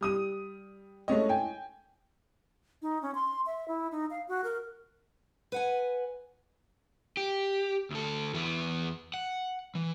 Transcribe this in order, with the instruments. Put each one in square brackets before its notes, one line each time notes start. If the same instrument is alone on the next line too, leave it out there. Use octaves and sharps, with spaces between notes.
[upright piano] G3 D#6 D#7
G#3 A3 C#4 D#5
G5 G#5
[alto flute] D#4
C#4
C6
E5
E4
D#4
F5
F#4
A#4
[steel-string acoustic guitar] B4 F#5 G#5
[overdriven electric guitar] G4
D2 A4
E2 B3
F#5
E3